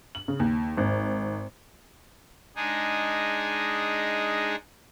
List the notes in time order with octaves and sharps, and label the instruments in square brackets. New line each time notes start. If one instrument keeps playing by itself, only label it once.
[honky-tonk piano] F#7
C#3
D#2
G#1
[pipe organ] G#3 D4 D#4 G#4